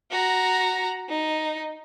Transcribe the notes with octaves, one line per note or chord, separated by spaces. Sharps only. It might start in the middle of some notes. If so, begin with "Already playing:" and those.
F#4 A#5
D#4